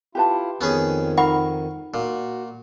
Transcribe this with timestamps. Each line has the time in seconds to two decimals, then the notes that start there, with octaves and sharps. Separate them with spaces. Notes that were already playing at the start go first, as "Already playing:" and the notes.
0.15 E4 F4 G4 B4 A5
0.61 F2 D#3 B3 C#4 G#4
1.18 D#4 A#4 F#5 B5 C#6
1.94 A#2 F#4